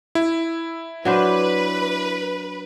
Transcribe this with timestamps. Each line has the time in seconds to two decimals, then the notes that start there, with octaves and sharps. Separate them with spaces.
0.15 E4
1.05 F#3 D4 B4 C5